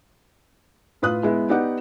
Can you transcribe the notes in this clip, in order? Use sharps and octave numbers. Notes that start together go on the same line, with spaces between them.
A2 F4 B4 D#6 F#6
G#3 B3 E4
B3 D#4 G4 D5 F#5